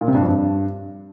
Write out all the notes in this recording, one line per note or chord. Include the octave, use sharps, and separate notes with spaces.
A#2
C3
G2
F2
G2